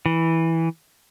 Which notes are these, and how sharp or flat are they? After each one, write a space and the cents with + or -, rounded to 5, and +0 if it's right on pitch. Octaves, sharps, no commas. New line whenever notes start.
E3 -10